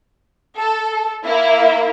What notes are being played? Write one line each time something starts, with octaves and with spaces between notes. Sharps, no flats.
A4
A#3 E4